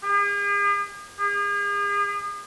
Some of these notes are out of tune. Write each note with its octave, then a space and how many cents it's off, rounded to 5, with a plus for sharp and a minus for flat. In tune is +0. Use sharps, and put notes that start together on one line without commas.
G#4 -45
G#4 -40